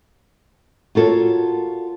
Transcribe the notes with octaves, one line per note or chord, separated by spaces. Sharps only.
F4 F#4 A4 A#4 C#5